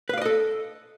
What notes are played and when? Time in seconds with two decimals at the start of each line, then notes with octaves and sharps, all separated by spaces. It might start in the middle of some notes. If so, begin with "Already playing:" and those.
0.09 B4
0.13 F5
0.17 D5
0.21 D#5
0.25 A4